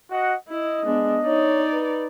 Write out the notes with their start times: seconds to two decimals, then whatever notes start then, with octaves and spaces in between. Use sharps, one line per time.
0.10 F#4 D#5 F#5
0.49 E4 D#5
0.84 G#3 B3 D4
1.26 D#4 C#5 D5
1.73 B4